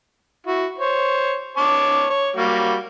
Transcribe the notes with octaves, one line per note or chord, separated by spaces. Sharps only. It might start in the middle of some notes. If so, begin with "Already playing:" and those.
E4 F#4
C5 C#5
C#5 A5 D6
C#5
G3 A#3 F#4